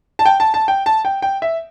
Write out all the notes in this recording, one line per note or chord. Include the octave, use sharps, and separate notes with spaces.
A5
G5
A5
A5
G5
A5
G5
G5
E5